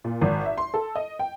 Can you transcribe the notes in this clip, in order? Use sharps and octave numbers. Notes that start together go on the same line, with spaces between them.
A#2
G#1
E5
C6
A4
D#5
G5